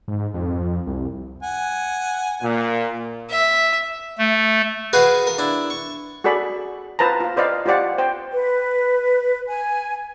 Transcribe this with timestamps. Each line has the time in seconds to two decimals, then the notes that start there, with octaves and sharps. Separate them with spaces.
0.08 G#2
0.34 F2
0.87 C2
1.43 F#5 G#5
2.42 A#2
3.30 E5
4.18 A3
4.93 F#4 G#4 B4 F5 F#5
5.27 A#4
5.38 D4 E4
5.70 C#6
6.24 F#4 G#4 A4 D5 B5
6.99 F4 B4 C5 A5 A#5
7.20 F4 F5
7.37 B4 C5 D5 D#5 F5
7.66 F4 G4 C5 D5 F#5
7.98 C5 G5
8.32 B4
9.48 G#5